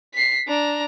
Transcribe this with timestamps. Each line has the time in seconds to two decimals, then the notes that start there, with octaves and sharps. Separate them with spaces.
0.14 B6 C7
0.48 D4 A#5